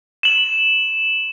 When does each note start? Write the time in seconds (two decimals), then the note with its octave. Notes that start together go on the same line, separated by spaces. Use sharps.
0.23 E7 F#7